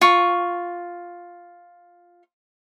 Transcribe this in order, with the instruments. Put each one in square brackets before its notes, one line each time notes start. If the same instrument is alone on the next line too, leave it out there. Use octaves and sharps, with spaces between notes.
[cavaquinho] F4 C#6